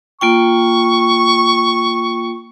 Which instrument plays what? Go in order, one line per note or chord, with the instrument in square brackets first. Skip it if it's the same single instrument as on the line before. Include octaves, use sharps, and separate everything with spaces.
[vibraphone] A#3 F4 G5 [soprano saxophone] C#6